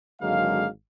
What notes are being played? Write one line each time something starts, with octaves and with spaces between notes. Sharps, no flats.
G#1 D3 F#3 G#3 A#3 F5